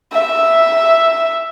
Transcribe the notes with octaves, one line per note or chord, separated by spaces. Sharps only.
E5